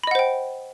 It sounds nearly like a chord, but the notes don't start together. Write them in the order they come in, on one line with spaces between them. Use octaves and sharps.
B5 D#5 F#5 C5 G5